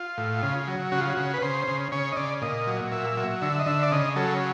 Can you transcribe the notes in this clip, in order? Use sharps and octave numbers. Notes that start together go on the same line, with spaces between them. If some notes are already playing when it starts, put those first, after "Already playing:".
Already playing: F4
A2
C#3
F#3
C#3 F#4
F4
F#4
C#3
B4
C#3 C5
C#3
C#3 C#5
D#5
C#3 D5
A#2 D#5
F#3
A#2 E5
F#3
D3 E5
D#5
D3 E5
D5
C#3 D#5
F#3 A4